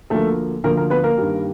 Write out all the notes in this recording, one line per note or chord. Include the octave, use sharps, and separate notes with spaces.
D2 D3 F3 A3 A#3 A4
D2 D3 F3 A#3 A#4
A#3 A#4
B3 B4
A#3 A#4
G2 D#3 G3 A#3